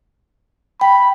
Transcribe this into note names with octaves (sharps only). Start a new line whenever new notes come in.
G5 B5